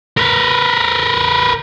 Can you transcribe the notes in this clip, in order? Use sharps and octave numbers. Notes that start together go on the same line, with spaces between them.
A#4 B4